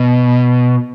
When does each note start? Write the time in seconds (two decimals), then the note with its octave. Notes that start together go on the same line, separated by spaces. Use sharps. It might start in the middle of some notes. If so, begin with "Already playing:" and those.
Already playing: B2